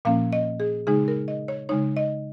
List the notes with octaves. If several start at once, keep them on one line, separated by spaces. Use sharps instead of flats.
A#2 F3 A#3 C#4 F5
D#5
G#4
C#3 G#3 D#4 G#4
A#4
D#5
C#5
C#3 G#3 D#4 C#5
D#5